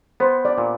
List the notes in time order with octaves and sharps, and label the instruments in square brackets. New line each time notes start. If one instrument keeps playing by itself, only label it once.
[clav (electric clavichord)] B3 [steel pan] C5
[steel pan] D5
[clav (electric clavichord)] A#2